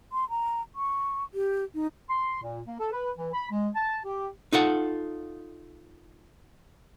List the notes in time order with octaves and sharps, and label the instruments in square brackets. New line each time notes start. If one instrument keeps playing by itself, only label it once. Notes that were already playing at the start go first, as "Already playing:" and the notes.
[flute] C6
A#5
C#6
G4
D#4
[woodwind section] C6
A#2
A#3
A4
B4
E3
B5
G#3
A5
G4
[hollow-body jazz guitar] D#4 F4 A4 F#5